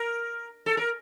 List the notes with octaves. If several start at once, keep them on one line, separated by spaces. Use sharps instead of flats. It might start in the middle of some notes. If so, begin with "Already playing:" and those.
Already playing: A#4
A4
A#4